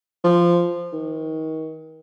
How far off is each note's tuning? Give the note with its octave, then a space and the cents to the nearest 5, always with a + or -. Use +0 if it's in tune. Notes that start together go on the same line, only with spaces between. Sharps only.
F3 -10
D#3 +30